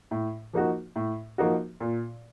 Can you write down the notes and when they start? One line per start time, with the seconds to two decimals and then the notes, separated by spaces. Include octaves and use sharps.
0.11 A2
0.53 F3 A#3 D#4 F#4
0.96 A2
1.38 F3 A#3 D#4 F#4
1.80 A#2